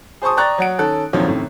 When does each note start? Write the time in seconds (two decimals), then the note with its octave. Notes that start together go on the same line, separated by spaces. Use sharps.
0.22 G#4 C5 A5 C#6 D#6
0.37 D5 G5 A#5 C#6 F#6 A6
0.58 F#3 F#5 D7
0.79 D#3 C#4 A4 F#6
1.13 A#1 F2 D#3 F3 F#3
1.27 F#2 A2 C3 D#3